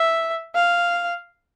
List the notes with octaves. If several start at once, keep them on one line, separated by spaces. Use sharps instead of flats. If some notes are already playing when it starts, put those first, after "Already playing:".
Already playing: E5
F5